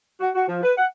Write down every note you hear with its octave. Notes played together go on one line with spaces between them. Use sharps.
F#4
F#4
F3
B4
F#5